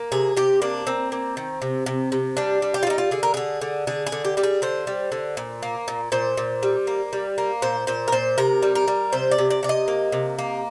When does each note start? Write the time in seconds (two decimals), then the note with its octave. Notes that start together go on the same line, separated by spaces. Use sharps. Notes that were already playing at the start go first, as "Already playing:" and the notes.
Already playing: A#3
0.12 C3 G#4
0.37 C3 G4
0.62 A#3 D4
0.87 A#3 C4
1.12 A#3
1.37 D#3
1.62 C3
1.86 C3
2.12 C3
2.37 G3 D4
2.62 G3
2.74 G4
2.83 F4
2.87 G3 D#4
2.98 F4
3.11 D3 G#4
3.23 A#4
3.34 D3 G#4
3.62 D3
3.87 D3 G#4
4.07 G#4
4.12 D3
4.24 G4
4.37 G3 G4
4.43 G#4
4.62 D3 C5
4.87 G3
5.12 D3
5.37 A#2
5.63 A#3
5.88 A#2
6.12 A#2 C5
6.37 A#2
6.63 G3
6.87 A#3
7.13 G3
7.38 A#3
7.62 A#2 C5
7.87 A#2 C5
8.08 A#4
8.12 A#2 C5
8.38 C3 A#4
8.62 G3
8.75 A#4
8.88 G3
9.12 C3 C5
9.31 D5
9.38 C3
9.50 D5
9.63 C3 D5
9.69 D#5
9.88 A#3
10.12 C3
10.39 A#3